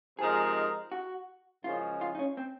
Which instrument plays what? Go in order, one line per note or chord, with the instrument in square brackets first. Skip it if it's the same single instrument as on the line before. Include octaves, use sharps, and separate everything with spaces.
[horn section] C3 F3 G#3 D#4 A#4 [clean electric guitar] G#4
[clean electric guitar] F#4
[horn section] F#2 C#3 F3 G#3 C#4 [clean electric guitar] F4
[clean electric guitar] F4
D#4
C#4
C4